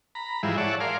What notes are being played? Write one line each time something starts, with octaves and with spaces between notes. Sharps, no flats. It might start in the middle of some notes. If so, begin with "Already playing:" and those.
A#5 B5
G#2 E3 F3 G3 G#3 E4
C#5 D5 E5 F#5 A5
G#4 A#4 D5 F5 C6